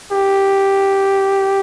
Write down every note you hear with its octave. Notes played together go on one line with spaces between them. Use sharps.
G4